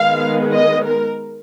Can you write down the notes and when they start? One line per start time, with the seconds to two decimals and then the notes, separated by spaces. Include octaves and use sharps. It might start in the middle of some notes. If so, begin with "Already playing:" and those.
Already playing: D#3 G#3 B3 F5
0.54 D#5
0.84 A#4